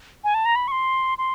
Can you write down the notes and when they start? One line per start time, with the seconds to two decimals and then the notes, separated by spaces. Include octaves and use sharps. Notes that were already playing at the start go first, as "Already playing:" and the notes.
0.24 G#5
0.34 A5
0.45 A#5
0.56 B5
0.68 C#6
0.72 C6
1.18 C6